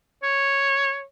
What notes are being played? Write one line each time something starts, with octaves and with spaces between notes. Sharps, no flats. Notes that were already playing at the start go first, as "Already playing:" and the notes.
C#5